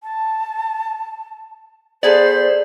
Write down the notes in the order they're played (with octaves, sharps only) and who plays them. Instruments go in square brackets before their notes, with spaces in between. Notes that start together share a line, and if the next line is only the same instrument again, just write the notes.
[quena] A5
[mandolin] B3 G#4 A4 [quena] C5 [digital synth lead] D5